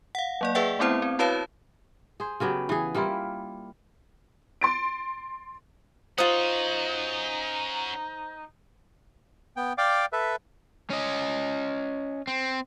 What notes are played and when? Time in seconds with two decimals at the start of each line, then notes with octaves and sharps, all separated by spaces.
0.15 F5 F#5
0.41 F#3 A#3 D5
0.55 G#4 B4 D5 E5 F#5 G5
0.79 A3 B3 C4 E4 C5
1.02 C4
1.19 E4 F#4 B4 C#5 F5 A5
2.20 G#4 C5
2.40 C#3 F#3 B3 G4
2.69 E3 G#4
2.95 G3 A#3 E4 F4
4.61 C6 A6 D7
6.18 C#4 D#4 F4 F#4 C5 D#6
9.57 B3 G5
9.78 D5 F5 G5 D6
10.13 A4 B4 E5
10.90 C#4 D#5
12.27 C4